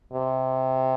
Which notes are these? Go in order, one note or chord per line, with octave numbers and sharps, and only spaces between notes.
C3